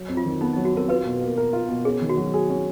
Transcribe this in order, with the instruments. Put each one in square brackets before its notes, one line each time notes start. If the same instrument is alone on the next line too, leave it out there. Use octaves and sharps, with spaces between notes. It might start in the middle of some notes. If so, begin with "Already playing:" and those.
Already playing: [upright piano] F#3
F2
[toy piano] F4
[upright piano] D#3
[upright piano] B3 [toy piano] D#4
[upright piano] F#3 [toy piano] D#4
[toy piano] F#4
[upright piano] F2 [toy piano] A#4
[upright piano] F4 [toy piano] B4
[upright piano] B2
A#3
A#4
F4
B2
[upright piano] C#4 [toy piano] G#4
[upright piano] D#3
[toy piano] F#4
[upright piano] F#3
G#4
C#4